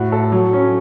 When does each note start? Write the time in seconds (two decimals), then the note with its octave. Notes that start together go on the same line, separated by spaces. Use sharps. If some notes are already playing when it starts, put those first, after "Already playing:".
Already playing: A2 F#4
0.12 A4
0.32 F#3
0.53 C#4